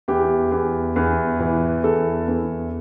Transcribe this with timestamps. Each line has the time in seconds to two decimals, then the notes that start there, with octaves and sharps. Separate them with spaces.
0.08 E2 G4
0.52 E2
0.96 E2
1.40 E3
1.83 E2 A4
2.28 E2